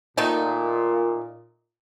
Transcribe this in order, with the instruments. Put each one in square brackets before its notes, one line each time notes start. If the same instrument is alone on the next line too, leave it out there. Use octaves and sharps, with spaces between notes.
[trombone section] A#2 [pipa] D#3 A3 D#4